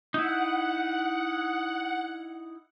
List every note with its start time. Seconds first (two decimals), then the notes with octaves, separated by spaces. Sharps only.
0.14 D#4 E4 F#5